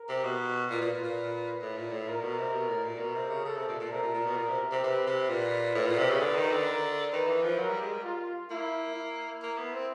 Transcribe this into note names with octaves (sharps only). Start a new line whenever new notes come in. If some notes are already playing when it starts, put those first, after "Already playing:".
Already playing: A#4
C3
B2
A#2 B4
A#2
A#2
A#2
A2
A#2
A2
A#2 A#4
B2
C3
B2
A2
A#2
B2 A#4
C3
C#3
C#3 A4
C3
A#2
A#2
C3 A#4
A#2
A#2
B2
A#2
C3
C3
C3 B4
C3
A#2 B4
A2 B4
A#2
C3
C#3
D3 B4
D#3
D3
A#4
D#3 B4
E3
F3
F#3 A#4
G3
G#3
G3
F4
A#3 E4
E4
A#3
B3
C4